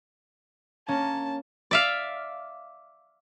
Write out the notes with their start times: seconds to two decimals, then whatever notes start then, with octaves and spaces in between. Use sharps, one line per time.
0.88 A#3 C#4 A5
1.71 D5 E5 F5